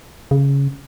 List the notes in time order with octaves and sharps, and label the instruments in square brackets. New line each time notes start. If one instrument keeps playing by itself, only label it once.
[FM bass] C#3